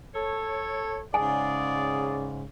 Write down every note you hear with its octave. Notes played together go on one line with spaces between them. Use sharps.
A4 C#5
G#2 C#3 G#4 D5 G#5